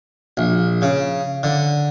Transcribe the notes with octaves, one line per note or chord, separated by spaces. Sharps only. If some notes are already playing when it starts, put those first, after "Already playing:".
A#1
C#3
D3